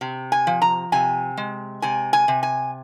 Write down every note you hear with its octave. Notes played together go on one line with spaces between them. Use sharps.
C3
G#5
F3
A#5
C3 G#5
G#3
C3 G#5
G#5
C3
G#5